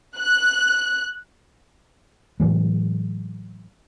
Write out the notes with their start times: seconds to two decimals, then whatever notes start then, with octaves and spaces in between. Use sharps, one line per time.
0.17 F#6
2.40 A2 E3 F#3 G#3